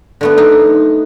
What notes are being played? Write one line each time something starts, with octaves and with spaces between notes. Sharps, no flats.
D3 A3 B3
D#4